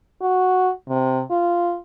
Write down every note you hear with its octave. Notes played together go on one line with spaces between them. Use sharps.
F#4
C3
F4